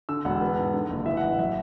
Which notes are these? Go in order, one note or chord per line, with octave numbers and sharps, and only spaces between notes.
D3 E6
E1 F#5
B3
G#2
D3
F#1
E3 E5
F#5
A1
F#3 E5